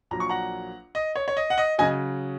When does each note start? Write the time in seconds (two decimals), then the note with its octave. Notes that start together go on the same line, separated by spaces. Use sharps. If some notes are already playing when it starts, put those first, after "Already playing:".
0.11 A#1 A#2 F#3 A#5
0.20 C#6
0.30 F#5 A#5
0.95 D#5
1.16 C#5
1.28 C#5
1.37 D#5
1.50 F#5
1.58 D#5
1.78 C#3 F#3 D#5 G#5